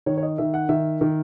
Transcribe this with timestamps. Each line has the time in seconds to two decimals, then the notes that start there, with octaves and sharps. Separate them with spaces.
0.06 D#3 C#5
0.18 C#5
0.23 D#5
0.38 D#3 E5
0.54 F#5
0.69 D#3 E5
1.01 D#3